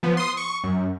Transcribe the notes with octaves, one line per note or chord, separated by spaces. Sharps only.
F3 B3
C6 D#6
C#6
F#2